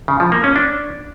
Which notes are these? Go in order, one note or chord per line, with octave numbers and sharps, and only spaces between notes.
C#3
F3
A#3
C#4
D4